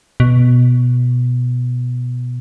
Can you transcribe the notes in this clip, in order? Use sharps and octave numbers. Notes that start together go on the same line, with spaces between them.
B2